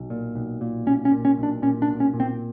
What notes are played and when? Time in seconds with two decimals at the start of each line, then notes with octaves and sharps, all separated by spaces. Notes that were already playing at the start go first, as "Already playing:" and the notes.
Already playing: B1
0.10 A#2
0.35 B1
0.61 A#2
0.86 B1 C#4
1.05 C#4
1.12 A#2
1.25 C#4
1.38 B1
1.43 D4
1.62 A#2 C#4
1.82 D4
1.88 B1
2.00 C#4
2.14 A#2
2.20 C4